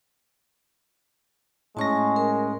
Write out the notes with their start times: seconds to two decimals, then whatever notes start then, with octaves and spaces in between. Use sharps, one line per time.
1.77 A2 G#3 C#4 A5 C#6 A#6
2.16 A#4